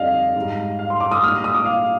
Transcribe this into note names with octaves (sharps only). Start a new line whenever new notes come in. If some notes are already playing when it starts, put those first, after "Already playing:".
Already playing: F2 D3 G3 D5 D#5 F5
G#2 G3
F5
C6
D6
D#6
A#2 G3 F6
D#6
D6
F5